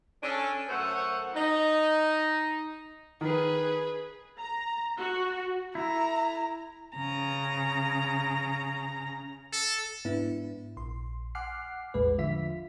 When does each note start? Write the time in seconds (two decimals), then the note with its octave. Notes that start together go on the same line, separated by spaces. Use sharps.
0.23 C#4 D4 A4
0.69 F#2 A3 A4 C5 C#5 F#5
1.34 D#4
3.21 D#3 G#4 B4
4.39 A#5
4.97 F#4
5.75 E4 A4 A#5
6.95 C#3 A#5
9.52 A4
10.05 G#2 B3 D4 E4
10.77 A#1 C6
11.35 F#5 G#5 D6 F6 F#6 C7
11.94 A1 E2 A2 G#3 B4
12.18 D3 F3 F4 E5 B6